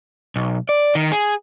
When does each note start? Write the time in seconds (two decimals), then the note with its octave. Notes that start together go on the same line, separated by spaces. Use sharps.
0.36 B1
0.69 D5
0.95 D#3
1.12 G#4